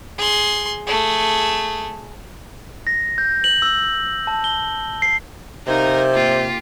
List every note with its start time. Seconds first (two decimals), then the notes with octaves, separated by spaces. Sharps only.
0.18 G#4 C6
0.87 A3 G#4
2.87 A#6
3.18 G6
3.44 F#7
3.62 E6
4.27 A5
4.44 G7
5.02 C7
5.67 C3 D#4 A#4 F5
6.15 A#3 F4 G4